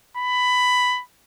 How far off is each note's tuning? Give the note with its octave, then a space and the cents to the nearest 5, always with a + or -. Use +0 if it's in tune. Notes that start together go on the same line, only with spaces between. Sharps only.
B5 +10